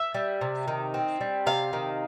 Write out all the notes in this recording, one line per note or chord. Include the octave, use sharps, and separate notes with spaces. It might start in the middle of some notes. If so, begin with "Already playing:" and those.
Already playing: E5
G3
C3
D#3
C4
G3
C3 F5
D#3